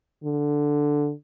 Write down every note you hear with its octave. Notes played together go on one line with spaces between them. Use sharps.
D3